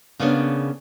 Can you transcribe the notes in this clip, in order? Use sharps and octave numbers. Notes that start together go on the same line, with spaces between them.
C#3 A#3 B3 C#4 D4